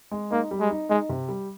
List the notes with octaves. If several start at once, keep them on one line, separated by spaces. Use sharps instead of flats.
G#3
A#3 D#4
G3
G#3
D#4
G#3 D#4
C3
G3